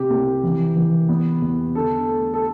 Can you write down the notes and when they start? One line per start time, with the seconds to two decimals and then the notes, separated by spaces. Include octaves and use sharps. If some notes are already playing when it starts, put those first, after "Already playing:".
Already playing: C3 G4
0.10 C2
0.43 E3
0.76 E3
1.09 B3
1.42 E2
1.75 D3 A4
2.08 A3
2.34 A4